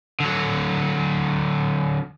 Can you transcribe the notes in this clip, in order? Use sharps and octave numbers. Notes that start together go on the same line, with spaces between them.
D3 F#3